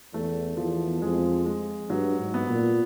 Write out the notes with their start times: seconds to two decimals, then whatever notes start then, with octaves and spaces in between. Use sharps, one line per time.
0.14 E2 A3
0.57 E2 F3
1.02 F2 G#3
1.46 G#3
1.89 G2 F#3
2.19 G#2
2.34 B3
2.49 A#2